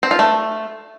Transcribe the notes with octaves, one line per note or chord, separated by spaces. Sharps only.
C4
F4
A3